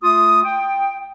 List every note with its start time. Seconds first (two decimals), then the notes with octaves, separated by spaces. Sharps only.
0.02 A3 F4 D#6
0.43 G5